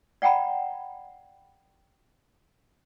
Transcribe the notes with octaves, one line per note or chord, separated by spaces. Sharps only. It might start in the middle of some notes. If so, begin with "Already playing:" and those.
D5 F#5 G5 A#5 B5